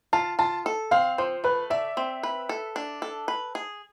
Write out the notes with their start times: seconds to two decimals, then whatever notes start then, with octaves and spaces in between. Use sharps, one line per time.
0.13 F4 A5
0.39 F4 A5
0.66 A4
0.91 C4 F5
1.18 F3 C5
1.44 A3 B4
1.70 D5 E5
1.97 C4
2.23 B4
2.49 A4
2.76 D4
3.02 A4
3.28 B4
3.55 G#4